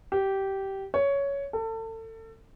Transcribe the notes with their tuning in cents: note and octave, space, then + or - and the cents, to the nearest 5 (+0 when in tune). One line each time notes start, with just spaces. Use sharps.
G4 -15
C#5 +10
A4 +30